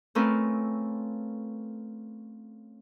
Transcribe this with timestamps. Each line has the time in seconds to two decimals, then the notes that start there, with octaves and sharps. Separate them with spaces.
0.15 A3 C4 C#4 F4 A#4 B4